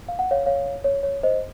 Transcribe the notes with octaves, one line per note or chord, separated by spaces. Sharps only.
F5
F#5
C#5 F5
C#5 F5
C#5
C#5
C5 D#5